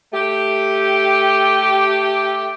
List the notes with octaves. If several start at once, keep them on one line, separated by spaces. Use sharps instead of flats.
A3 G4